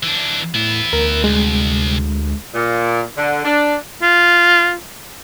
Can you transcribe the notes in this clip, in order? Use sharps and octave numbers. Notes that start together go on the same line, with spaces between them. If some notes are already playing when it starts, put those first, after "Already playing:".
E3 D4
A2 B3 E4
D2 A#4
C2 G#3
A#2
D3
D4
F4